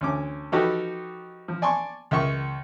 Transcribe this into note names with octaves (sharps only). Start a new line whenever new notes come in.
D2 C#4 D6
F3 D#4 F#4 G4 A4 B4
F3
D5 G#5 A5 C6 C#6
C#2 A#4 E5 C6 C#6